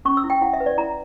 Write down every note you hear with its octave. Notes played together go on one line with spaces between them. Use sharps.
C#4 C#6
E6
E4
G5
E4 F#5
E5
B4
D5
E4 A#5